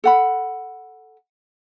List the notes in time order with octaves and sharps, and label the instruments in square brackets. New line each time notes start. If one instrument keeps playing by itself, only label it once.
[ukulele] A4 F#5 B5